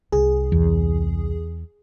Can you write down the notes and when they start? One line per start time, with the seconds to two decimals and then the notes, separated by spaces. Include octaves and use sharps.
0.12 C2 G#4
0.52 E2